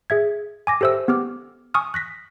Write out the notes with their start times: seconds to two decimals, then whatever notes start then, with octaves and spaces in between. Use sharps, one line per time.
0.10 G#4 E5 G#6
0.67 G#5 D6 A#6
0.81 G4 A4 C5 E5 E6
1.08 B3 G4 D6 F6
1.74 G#5 C#6 D#6 F6
1.94 F#6 A#6 B6